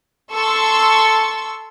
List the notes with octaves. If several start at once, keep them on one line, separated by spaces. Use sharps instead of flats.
A4 A5 C6 C#6 E6